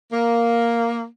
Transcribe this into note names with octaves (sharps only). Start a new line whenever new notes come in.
A#3